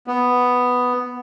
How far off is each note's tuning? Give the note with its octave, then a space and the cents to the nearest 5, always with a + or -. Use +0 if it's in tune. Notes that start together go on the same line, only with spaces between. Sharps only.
B3 +5